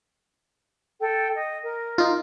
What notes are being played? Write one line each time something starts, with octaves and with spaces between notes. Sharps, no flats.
A4 G5
D#5
A#4
D#4 F4